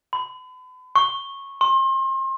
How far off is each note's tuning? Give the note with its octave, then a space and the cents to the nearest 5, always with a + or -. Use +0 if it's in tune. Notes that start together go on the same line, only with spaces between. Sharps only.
B5 +40
C#6 -15
C6 +35